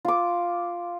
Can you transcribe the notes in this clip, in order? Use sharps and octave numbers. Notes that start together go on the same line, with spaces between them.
F4 D6